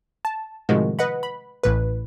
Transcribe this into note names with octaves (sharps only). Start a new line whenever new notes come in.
A5
A2 C3 D#3 F3 G#3 F#4
B4 D#5 F#5 B5
B5
A1 A2 B4